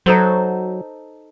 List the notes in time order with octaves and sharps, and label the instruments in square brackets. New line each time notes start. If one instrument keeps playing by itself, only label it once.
[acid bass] F#3 [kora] D#4 A4 C5